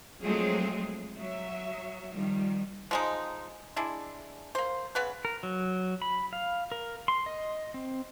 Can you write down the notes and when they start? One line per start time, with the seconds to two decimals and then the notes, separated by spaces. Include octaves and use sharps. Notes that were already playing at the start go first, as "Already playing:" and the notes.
0.23 F3 F#3 G#3 A3 C4 G#4
1.17 F#3 E5
2.12 D#3 F3 G3
2.91 F3 G#3 D#4
3.76 G#3 D4 E4
4.55 A#3 C5
4.95 C#3 B3 B4
5.25 A#4
5.43 F#3
6.02 B5
6.33 F5
6.72 A#4
7.08 C6
7.26 D#5
7.74 C4